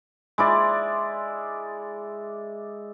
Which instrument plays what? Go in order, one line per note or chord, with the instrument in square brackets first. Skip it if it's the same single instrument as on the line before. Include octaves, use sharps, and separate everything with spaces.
[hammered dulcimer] G#3 E4 D5